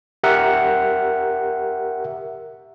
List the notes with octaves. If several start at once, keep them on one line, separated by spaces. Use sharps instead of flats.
G4 A#4 E5 F#5